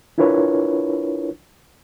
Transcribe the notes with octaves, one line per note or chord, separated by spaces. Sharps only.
D4 E4 F4 A#4 B4 C#5